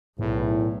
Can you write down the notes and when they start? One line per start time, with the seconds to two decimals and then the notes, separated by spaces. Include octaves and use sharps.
0.19 B1 E2 A2